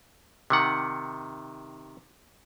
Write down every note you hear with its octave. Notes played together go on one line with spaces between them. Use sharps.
C3 D#3 F#5